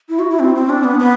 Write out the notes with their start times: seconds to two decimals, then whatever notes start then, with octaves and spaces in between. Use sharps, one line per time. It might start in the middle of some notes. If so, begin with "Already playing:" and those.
0.09 E4
0.19 F#4
0.30 E4
0.40 C4
0.55 C4
0.69 D4
0.84 B3
0.99 B3